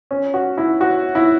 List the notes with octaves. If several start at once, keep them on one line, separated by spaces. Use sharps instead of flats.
C#4
F#4
E4
F#4
E4